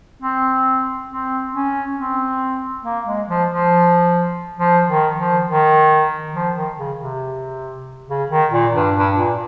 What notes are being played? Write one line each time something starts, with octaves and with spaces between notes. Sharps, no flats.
C4
C4
C#4
C4
A#3
G#3
F3
F3
F3
D#3
F3
D#3
F3
D#3
C#3
C3
C#3
D#3
A#2
G2
G2
A#2